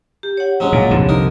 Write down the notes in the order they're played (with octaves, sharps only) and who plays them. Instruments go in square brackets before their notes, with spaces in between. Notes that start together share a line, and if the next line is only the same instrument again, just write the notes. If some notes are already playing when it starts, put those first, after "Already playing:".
[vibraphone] G4
C#5 F#5
[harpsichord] F#3 G#3 C#4
[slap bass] A#2
C2 F2 D3
[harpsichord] D#4 A#4